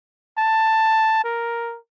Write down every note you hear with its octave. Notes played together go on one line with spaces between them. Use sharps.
A5
A#4